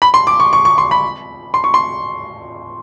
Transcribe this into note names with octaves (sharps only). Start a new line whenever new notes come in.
B5
C6
D6
C#6
C#6
C#6
C6
B5
C6
C#6
C6